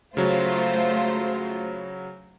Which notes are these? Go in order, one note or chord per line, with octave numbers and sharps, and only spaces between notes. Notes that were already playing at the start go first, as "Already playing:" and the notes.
C#3 F#3 A3 F4 C5